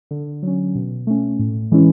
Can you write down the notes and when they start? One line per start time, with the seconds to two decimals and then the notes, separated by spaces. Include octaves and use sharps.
0.11 D3
0.43 F#3 C#4
0.75 B2
1.07 A3 C#4
1.39 A2
1.72 E3 G#3 C#4 E4